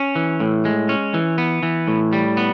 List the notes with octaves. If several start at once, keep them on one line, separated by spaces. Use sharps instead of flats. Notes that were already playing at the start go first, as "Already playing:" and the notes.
Already playing: C#4
E3
A2
G#3
C#4
E3
B3
E3
A2
G3
B3